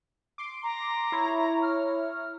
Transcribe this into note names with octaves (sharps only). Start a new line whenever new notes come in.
C6 D6
A#5
E4 C#5
F6